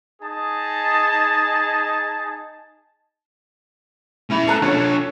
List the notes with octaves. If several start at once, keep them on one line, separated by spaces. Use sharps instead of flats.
D#4 G#4 A5
C#4 E4 B5
A4 A#5 F#6
D4 F4 A4 C#5